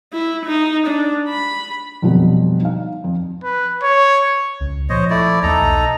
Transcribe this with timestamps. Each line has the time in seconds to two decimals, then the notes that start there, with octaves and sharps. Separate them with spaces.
0.13 E4
0.46 D#4
0.87 D4
1.29 B5
2.02 F2 B2 D3 F#3 G3 A#3
2.61 D#4 F5
3.04 F2
3.44 B4
3.83 C#5
4.61 C#2
4.89 A#2 F3 C5 C#5 D#5
5.10 A3 E4 D5
5.43 D#1 E2 A#3 D#4 A4 A#5
5.61 B1